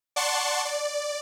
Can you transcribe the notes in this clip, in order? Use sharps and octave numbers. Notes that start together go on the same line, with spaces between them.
D5 F#5 A5 C6 C#6
D5